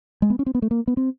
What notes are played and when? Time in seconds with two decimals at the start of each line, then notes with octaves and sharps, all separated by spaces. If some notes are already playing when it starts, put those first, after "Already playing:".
0.22 G#3
0.30 B3
0.39 C#4
0.46 C4
0.55 B3
0.62 A3
0.71 A#3
0.87 B3
0.97 C4